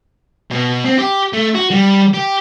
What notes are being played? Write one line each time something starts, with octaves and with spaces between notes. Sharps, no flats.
B2
C4
G4
A3
F#4
G3
G4